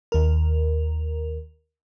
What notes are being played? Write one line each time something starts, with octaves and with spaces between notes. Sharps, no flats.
D#2 A#4